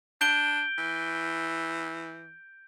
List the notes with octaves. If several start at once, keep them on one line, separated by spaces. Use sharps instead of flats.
D4 G6 D7 G7
E3